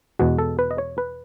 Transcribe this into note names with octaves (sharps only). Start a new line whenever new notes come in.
E2 B2 G#3 F#4
A4
B4
D#5
C#5
B4